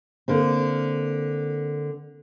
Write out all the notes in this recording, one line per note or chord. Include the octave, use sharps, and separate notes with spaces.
D3 A#3 C4